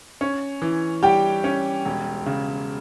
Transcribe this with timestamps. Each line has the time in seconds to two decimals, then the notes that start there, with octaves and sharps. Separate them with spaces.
0.21 C#4
0.62 E3
1.03 G3 G4 G5
1.44 C#4
1.85 E1
2.26 C#3